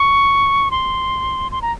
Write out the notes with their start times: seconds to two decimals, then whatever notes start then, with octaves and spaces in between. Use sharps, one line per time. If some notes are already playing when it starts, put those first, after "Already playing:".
Already playing: C#6
0.71 C6
1.52 C6
1.62 A#5